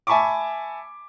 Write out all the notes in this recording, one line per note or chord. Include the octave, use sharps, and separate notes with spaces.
E5 G#5 A5 B5 C#6 D6